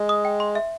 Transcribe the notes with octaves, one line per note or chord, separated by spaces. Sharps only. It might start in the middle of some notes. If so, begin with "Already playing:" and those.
Already playing: G#3
D#6
G5
C6
E5